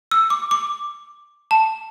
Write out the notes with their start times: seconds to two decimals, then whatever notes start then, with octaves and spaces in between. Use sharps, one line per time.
0.11 E6
0.30 D6
0.51 D6
1.51 A5